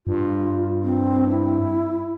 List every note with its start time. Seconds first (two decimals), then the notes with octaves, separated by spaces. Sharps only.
0.07 G2 F4
0.84 C4
1.29 E4